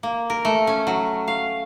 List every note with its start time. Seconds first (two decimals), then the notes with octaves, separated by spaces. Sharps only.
0.03 A#3
0.30 A#4
0.45 A3
0.67 C#4
0.87 F#3
1.28 F5